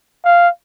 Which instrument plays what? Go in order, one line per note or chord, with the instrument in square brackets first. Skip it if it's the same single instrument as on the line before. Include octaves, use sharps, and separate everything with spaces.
[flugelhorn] F5